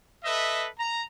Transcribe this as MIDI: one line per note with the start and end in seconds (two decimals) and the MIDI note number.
0.24 0.67 69
0.24 0.67 71
0.24 0.67 75
0.24 0.67 76
0.79 1.02 82